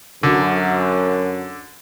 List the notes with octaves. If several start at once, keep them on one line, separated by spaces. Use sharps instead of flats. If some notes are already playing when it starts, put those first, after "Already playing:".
F#2 D3